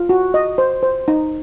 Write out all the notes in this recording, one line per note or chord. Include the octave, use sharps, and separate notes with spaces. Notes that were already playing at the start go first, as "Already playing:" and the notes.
Already playing: F4
F#4
D#5
C5
C5
D#4